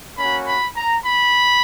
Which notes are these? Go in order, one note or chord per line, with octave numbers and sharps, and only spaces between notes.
A#3 C#4 F#4 B5
B5
A#5
B5